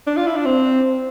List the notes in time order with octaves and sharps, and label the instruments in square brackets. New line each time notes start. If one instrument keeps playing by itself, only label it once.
[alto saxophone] D4
F4
E4
D4
C4